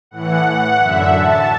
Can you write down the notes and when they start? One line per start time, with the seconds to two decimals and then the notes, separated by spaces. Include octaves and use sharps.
0.11 A2 E3 F#5
0.46 F#5
0.79 F#2 D3 E5
1.13 A5